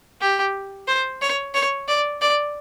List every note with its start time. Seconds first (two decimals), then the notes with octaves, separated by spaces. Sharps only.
0.21 G4
0.87 C5
1.22 C#5
1.54 C#5
1.88 D5
2.22 D5